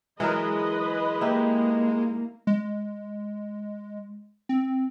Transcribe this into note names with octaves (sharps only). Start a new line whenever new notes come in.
E3 F#3 G#3 A#4 B4 D#5
A#3 D#4 E4 G4
G#3
C4